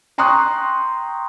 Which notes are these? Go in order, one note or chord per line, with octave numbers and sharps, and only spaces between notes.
G5 A#5 C6 C#6 D#6 F#6